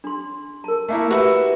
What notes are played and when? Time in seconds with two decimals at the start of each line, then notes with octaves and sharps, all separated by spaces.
0.04 D4 C6
0.64 A#4 A5
0.89 A3 A#3 E4
1.11 F#4 G4 B4 E5